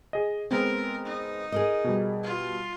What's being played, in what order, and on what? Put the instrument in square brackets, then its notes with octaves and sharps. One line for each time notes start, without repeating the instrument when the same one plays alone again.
[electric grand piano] G#4 D#5
[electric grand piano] G#3 B3 C4 [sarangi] A#4
[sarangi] D#4
[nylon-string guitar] G#4 A#4 D#5
[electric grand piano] B2 G3
[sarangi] F4